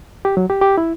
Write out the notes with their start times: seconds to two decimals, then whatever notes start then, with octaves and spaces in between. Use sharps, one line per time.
0.25 G4
0.37 F#3
0.50 G4
0.61 G4
0.78 E4